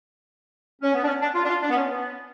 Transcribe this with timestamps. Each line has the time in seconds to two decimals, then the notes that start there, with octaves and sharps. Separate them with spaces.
0.82 C#4
0.94 B3
1.03 D4
1.07 C#4
1.21 D4
1.34 F4
1.44 D4
1.49 F4
1.62 D4
1.70 B3
1.76 C#4
1.90 B3